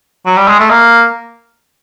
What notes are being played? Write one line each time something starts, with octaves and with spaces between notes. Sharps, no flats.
F#3
G3
G#3
A3
A#3